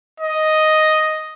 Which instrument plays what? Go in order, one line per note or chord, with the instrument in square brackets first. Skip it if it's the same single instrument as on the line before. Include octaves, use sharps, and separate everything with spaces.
[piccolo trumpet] D#5